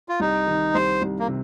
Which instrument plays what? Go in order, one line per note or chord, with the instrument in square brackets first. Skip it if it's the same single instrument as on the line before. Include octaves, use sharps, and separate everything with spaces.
[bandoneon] F4
[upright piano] C2 [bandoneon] D#4
[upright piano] D#3
[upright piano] C2 [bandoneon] C5
[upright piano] C2
[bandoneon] A#3
[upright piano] C3